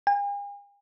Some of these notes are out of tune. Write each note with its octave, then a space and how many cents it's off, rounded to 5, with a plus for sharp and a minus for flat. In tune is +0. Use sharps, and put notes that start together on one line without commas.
G#5 -45